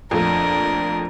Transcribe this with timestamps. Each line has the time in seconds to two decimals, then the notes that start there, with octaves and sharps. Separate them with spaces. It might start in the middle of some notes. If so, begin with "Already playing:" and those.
0.11 F2 A#2 A3 D4 A#4